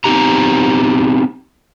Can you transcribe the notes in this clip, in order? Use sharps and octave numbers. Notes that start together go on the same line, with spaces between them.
B3 C4 D#4 G4 A#5